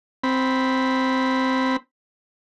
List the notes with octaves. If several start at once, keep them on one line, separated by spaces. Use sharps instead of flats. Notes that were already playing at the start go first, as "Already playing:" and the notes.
C4 B5